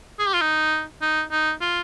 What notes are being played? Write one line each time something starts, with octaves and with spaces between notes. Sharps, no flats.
G#4
G4
F4
D#4
D#4
D#4
F4